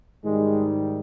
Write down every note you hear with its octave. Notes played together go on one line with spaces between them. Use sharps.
G#2 D#3 G3 G#3